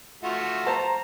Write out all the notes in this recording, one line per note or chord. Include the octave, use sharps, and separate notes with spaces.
A3 F4 F#4
C5 A5 A#5